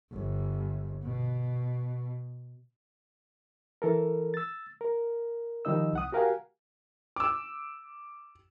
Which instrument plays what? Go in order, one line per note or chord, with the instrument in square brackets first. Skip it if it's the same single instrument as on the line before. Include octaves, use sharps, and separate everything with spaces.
[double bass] G1
B2
[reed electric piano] E3 A4 A#4
E6 A6
A#4
D#3 F3 G3 D#4 D#5 E6
C2 F#5 D#6
F#4 G4 A#4 F5 F#5 G#5
[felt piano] D6 E6